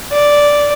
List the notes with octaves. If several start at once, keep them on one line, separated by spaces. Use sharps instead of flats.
D5